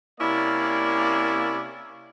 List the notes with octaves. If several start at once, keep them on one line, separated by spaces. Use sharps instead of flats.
C3 A#3 C#4 E4 D5